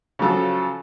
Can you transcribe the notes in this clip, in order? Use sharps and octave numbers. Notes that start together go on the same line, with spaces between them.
C#3 F3 F#3 A4